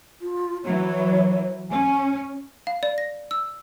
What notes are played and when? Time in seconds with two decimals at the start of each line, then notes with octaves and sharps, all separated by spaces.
0.21 F4
0.64 E3 F#3 C#5
1.71 C#4 G#5
2.67 F5
2.83 D5
2.98 A#6
3.31 E6